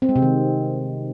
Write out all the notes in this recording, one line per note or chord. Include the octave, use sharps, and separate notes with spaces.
C4
G#3
C3
D#3